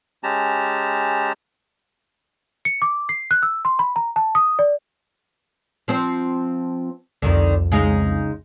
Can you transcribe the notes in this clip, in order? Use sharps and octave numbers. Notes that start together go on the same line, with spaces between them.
G#3 C#4 G4 A5 A#5
C#7
D6
C7
F#6
E6
C6
B5
A#5
A5
D#6
D5
F3 C4 C5
C2 F2 D3 D#3
C#3 G#3 D#4